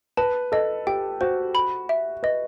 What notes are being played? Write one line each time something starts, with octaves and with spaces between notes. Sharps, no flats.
B4 A5
A4 D#5
G4 G5
F#4 C5
B5
E5
B4 D#5